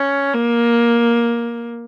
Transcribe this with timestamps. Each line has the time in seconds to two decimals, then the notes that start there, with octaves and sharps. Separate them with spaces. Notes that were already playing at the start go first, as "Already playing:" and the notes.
Already playing: C#4
0.34 A#3